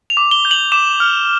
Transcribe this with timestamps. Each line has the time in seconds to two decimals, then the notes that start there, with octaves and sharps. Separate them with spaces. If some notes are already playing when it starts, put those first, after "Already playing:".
0.10 F7
0.17 D6
0.31 G7
0.45 G6
0.51 F#7
0.72 D6 E7
1.00 F6